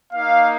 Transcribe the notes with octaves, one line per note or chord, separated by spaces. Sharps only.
A#3 D#4 F5